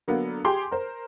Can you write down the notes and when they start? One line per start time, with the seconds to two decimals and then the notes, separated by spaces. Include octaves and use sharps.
0.08 D3 F#3 A#3 B3
0.45 G4 G#4 C6 D6
0.71 A#4 C5